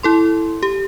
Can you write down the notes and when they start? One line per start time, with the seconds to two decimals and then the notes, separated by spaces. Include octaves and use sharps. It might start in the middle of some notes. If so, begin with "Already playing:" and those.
0.03 E4 A4 C6
0.63 G4